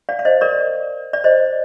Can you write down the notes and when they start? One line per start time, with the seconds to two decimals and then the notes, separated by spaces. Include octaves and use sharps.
0.09 D5 F5
0.19 F5
0.25 C5 D#5
0.41 A#4 D5
1.13 D5
1.24 C5 D#5